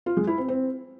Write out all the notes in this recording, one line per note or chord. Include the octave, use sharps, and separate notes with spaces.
F4
G#3
E4
C4
C4